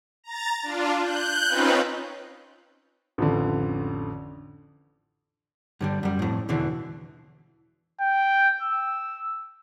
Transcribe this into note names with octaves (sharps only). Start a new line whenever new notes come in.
A#5 A6
D4 F4
F#6 G6
C4 C#4 D#4 F4 B4
A1 F2 D3
G2 D3 G3
F#2 G3
F2 A2
E2 B2 D3 E3
G5
E6